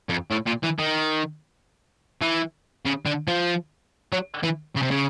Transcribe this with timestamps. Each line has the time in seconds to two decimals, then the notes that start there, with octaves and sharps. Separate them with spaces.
0.09 F2
0.31 A2
0.46 A#2
0.63 E3
0.79 D#3
2.22 E3
2.85 C#3
3.06 D3
3.28 F3
4.12 F#3
4.43 E3
4.76 C#3
4.82 C3
4.91 C#3